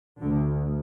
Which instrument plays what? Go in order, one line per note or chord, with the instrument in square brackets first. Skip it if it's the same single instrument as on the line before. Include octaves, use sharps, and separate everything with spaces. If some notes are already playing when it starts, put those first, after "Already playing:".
[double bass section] D2 D3